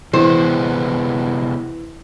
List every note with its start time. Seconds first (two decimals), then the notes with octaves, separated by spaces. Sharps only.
0.13 C3 E3 G#3 B3 C5